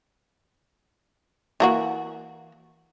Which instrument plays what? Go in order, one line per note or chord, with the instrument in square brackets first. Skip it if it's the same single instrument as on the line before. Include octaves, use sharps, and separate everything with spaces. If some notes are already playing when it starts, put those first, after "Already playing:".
[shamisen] E3 A#3 F#4